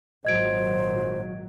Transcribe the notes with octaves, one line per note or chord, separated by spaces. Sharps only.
G#1 A#2 F#3 C5 D#5 G#6 D7